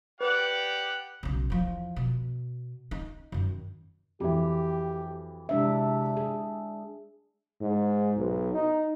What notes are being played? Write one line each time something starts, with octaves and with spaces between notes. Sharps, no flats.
G4 B4 D5 F#5 F#6
B1 C#3
E2 F3
B2
D#4
F#2 D#3
F2 E3 F#4 G4
C3 G#3 D4 E5
G#4
G#2
B1
D#4